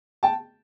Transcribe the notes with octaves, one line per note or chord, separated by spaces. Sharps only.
G5 A5